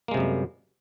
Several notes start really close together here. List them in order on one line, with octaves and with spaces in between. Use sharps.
A#3 G#3 C3 F#2 G3